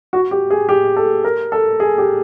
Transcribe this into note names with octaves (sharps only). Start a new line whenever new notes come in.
F#4
G4
G#4
G4
A4
A#4
A4
G#4
G4